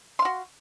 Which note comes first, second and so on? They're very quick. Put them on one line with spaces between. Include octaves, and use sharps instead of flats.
C6 F5 F#4